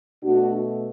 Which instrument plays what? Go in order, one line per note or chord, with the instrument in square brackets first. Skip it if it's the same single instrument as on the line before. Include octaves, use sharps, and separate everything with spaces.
[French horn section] B2 A3 D4 F#4